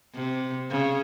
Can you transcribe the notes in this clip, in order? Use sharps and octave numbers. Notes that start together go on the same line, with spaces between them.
C3
C#3